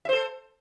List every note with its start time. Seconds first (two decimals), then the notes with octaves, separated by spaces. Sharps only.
0.05 E5
0.09 C5
0.13 A4